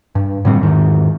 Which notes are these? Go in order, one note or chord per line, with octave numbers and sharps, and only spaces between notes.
G2
A2 D3 G3 C4
E2 G#2 D#3